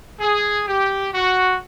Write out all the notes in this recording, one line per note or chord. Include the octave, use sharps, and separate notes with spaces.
G#4
G4
F#4